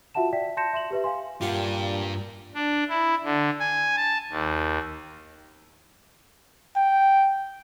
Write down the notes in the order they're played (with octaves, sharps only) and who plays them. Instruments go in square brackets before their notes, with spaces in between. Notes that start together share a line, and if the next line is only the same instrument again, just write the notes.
[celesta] F4 F#4 E5 F#5 A5 E7
D5 E5 G5 B6
A5 C6 G6 A#6 C#7 E7
E5 C6 E7 F#7
G4 B4 E5
F5 G#5 C6
[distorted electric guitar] G2 [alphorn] A#2 [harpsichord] G3 F5 F#5 [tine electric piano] F4
[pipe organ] D4
E4
D3
G#5
A5
D#2
[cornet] G5